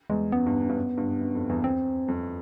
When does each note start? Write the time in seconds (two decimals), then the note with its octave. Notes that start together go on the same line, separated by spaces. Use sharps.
0.10 E2 G#3
0.32 F#2 B3
0.46 G2
0.61 F#2
0.69 G2
0.76 F#2
0.98 G2
1.20 F#2
1.35 F2
1.49 E2
1.64 C4
2.08 F2